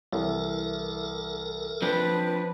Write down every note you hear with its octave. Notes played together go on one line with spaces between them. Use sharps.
C2 E3 A4 A#4
F3 C4 D4 B4